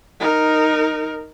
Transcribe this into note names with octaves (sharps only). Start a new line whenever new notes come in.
D#4 A#4